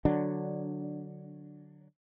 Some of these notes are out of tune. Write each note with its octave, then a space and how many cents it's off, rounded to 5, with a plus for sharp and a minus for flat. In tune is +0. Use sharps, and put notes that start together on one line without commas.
D3 +5 F#3 +0 D4 +0